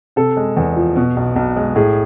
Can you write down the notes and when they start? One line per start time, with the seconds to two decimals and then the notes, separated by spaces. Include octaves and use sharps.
0.16 C3 A4
0.37 G#3
0.57 E2
0.76 F3
0.96 B2
1.17 B1
1.36 B1
1.56 G#3
1.76 A2 G#4